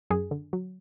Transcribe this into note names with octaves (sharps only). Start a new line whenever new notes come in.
F#2 G#4
D3
F#3